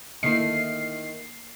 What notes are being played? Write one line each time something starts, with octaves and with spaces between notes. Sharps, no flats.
D3 D#3 A#3 E4 C7